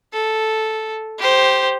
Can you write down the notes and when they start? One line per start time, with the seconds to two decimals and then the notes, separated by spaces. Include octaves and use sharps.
0.13 A4
1.19 G4 C5